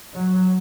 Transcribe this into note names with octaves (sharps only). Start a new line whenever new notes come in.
F#3